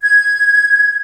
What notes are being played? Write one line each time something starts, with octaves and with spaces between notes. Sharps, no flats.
G#6